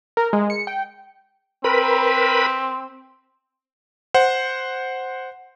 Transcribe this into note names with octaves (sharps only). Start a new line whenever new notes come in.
A#4
G#3
C#7
G5
C4 A#4 B4 B5
C5 F#5